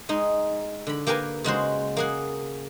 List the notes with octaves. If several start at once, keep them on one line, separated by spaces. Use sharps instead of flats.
G#3 D#4
D3 B5
A#3 G4 A#4 B4 G#5
C#3 G#3 F#4 C5
A#3 G#4 F#5